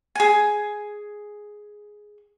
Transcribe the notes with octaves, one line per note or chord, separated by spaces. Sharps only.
G#4 G#5